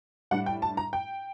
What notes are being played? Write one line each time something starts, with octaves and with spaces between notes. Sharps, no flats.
A2 G3 D4 F#5
G5
A5
A#5
G5